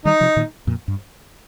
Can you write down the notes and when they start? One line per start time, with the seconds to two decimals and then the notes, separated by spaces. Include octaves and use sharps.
0.05 D#3 G3 D#4
0.21 C3 F3
0.36 A#2 D#3
0.67 F2 A#2
0.88 G2